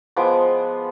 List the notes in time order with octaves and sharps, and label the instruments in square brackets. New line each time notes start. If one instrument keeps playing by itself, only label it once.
[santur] F3 G#3 B3 D6